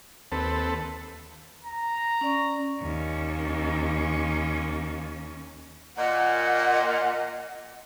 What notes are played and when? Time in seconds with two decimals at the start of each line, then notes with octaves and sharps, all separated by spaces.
0.32 D#2 C4 A4 B4
1.65 A#5
2.21 C#4 D5 C#6
2.81 D#2 C#4
5.97 A#2 D#5 F#5